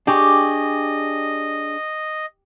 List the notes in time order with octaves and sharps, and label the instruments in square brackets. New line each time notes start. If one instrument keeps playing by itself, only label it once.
[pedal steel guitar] D4 G#4 C#6 [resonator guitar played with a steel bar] G4 [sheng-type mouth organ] D#5